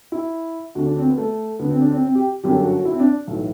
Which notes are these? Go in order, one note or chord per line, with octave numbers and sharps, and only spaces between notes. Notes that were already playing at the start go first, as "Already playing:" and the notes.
E4
D2 D3 F#4
D4
C4
B3
A3
D2 D3 B3
C4
D4
C4
C4
G4
G1 F#2 D3 G4
F#4
F#4
E4
C4
D4
B1 A2 E3